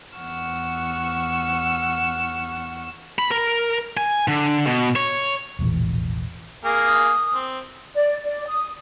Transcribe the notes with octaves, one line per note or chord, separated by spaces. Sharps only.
E2 F#5 C#6 E6 F6
B5
A#4
G#5
D3
B2
C#5
E1 A#1 A2 E3
A#3 G#4 A#4
D#6
C4
D5
D5
D#6